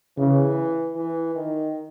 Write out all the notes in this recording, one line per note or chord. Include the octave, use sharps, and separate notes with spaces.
C#3 E3
E3
D#3